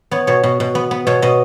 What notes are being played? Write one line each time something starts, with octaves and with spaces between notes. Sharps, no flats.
B3 C#5
B2 C#5
B2
B2
B3
B3
B2 C#5
B2 D#5